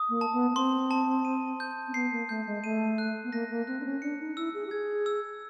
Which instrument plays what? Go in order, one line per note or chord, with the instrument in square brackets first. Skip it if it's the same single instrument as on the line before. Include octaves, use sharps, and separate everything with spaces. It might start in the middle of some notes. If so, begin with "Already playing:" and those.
Already playing: [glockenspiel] D#6
[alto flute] A#3
[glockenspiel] A5
[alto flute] B3
B3
[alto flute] C4 [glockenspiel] C6
[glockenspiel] A5
D#7
G6
[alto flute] C4
[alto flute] B3 [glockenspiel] C7
[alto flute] A#3
[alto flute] A3 [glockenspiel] G6
[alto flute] G#3
[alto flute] A3 [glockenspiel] D#7
[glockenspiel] F#6
[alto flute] B3
[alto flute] A#3 [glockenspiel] A#6
[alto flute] A#3
[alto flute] C4 [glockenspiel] F#6
[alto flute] D4
C#4
[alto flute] D4 [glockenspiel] C#7
[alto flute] D#4
[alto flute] E4 [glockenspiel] E6
[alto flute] G#4
G4
[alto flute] G#4 [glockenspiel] G#6
[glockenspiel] E6